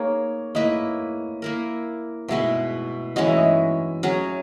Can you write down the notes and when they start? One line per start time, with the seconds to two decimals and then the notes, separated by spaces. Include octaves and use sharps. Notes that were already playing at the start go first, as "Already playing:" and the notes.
Already playing: A#3 D#4 G#4 C#5
0.55 A#3 E4 B4 D#5
1.42 A#3 E4 A#4
2.28 B2 G#3 B3 E4 E5
3.16 E3 G#3 C#4 F#4 D#5
3.27 E5
3.37 D#5
4.03 F#3 C#4 G#4